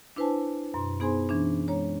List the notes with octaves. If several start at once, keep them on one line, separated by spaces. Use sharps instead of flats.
D4 E4 B4 C5 G#5 A5
F#2 B2 C6
B3 D#4 G#4 C5 G#5 C6
E3 C#4 D4
G#3 C#5 A#5